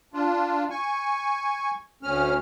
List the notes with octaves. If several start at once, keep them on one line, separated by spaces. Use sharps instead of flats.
D4 F4
G#5 C#6
D2 C#4 F6